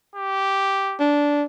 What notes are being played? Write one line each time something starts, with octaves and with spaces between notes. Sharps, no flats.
G4
D4